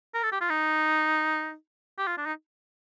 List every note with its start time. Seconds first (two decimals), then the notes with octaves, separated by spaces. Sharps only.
0.14 A#4
0.23 A4
0.32 G4
0.41 F4
0.50 D#4
1.98 G4
2.07 F4
2.17 D4
2.26 D#4